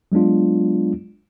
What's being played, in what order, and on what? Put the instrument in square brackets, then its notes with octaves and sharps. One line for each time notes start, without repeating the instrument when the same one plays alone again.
[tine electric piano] F#3 G#3 B3 D4 F4